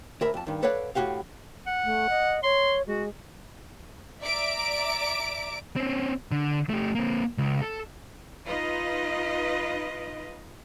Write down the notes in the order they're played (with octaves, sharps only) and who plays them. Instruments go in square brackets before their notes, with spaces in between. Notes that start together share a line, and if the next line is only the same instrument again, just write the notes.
[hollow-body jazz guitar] D2 A#4 E5 B5
F2 A5
G2 D#3
A4 B4 C#5 D5 F5 F#5
A2 D#4 F#4 G4 F5
[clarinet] F#5
[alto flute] A3
D#5
[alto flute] C#5 [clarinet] C6
[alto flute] G#3 [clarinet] F#4
[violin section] D5 E5 A#5 D6 D7
[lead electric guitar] C4 C#4
D3
A3 G4
A#3 C4
C#2
A4
[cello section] D#4 F4 B4 D#5